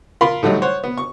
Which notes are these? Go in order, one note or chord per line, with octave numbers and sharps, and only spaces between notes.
F4 A#4 F5 B5 C6
A2 D3 F#3 G3 D#4
C5 C#5 F#5
B3
C#6